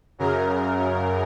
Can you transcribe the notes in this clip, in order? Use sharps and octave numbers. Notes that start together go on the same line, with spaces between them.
F#2 C#3 A#4